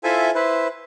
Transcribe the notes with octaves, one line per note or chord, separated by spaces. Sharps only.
E4 F4 A4 C5 E5 G#5
E4 B4 C5